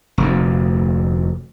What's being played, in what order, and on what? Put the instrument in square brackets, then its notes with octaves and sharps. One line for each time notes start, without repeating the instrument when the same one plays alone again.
[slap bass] F1 D2